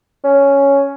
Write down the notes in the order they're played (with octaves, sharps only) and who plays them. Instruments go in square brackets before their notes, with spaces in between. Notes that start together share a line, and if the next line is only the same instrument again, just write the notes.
[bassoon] C#4